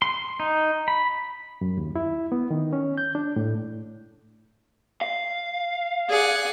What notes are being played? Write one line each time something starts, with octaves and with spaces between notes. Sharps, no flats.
C6
D#4
B5
F#2
D#2
E4
B3
D#3
C#4
G6
D4
A2
F5
G#4 D5 F#5